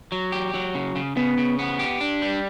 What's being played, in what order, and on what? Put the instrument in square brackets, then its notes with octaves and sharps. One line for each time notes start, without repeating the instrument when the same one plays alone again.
[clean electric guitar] F#3
G4
F#3
C#3
C#3
[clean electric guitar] C#3 [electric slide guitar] B3
[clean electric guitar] C#3
B3
G4
D4
G3